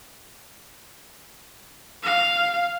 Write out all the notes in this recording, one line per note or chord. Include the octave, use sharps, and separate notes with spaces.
F5